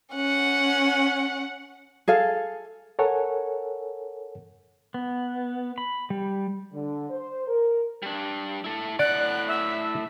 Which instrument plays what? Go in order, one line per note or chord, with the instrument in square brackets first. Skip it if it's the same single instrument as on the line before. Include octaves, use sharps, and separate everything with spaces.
[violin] C#4 F#5
[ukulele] G#4 A4 F5
[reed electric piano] A4 A#4 C#5 F#5 G#5
[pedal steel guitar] B3
B5
G3
[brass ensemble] D3
C5
A#4
[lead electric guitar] G3 D4
E4 A4
[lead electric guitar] A2 F#5 [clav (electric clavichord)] D5 [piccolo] F#6
[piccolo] E5